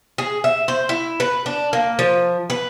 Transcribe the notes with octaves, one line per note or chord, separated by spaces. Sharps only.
G#4
E5
C5
E4
B4
D4
A#3
F3
B4